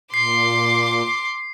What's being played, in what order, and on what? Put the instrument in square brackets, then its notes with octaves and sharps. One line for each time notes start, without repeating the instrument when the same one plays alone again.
[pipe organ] A#2 [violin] C6 D6 [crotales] C7